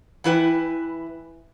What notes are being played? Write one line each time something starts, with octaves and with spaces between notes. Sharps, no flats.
E3 E4 B4 G5